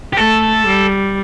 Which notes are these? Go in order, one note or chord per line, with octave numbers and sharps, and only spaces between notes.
G4
A3 A4
G3